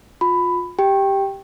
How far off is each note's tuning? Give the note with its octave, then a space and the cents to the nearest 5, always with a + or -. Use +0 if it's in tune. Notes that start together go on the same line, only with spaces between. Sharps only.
F4 +25 B5 +15
G4 +0 G5 +0